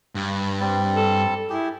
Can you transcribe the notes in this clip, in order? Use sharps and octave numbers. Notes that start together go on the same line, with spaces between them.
G2
G3 C4 D5
A4
E4 G4 G#4